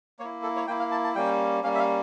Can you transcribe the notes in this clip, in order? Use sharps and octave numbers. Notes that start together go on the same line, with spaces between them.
A#3 E4 C#5
A4
C#5
A#3 E4 G5
F5
A5
A5
G3 A#3 C#4 G5
G3 A#3 C#4 F5
E5
F5